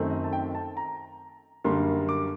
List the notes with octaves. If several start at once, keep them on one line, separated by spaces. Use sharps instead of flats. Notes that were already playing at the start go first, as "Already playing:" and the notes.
Already playing: F#2 D#3 A3 C4
D#5
A5
G5
A5
A#5
F#2 D3 G3 A#3 C6
D6